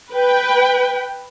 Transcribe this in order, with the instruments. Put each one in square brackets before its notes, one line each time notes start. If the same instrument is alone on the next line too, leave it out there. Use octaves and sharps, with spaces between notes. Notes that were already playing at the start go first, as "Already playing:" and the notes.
[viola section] B4 G5